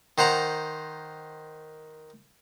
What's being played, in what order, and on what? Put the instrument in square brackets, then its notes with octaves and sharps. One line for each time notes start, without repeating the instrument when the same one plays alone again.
[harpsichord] D#3 C5 F#5 A#5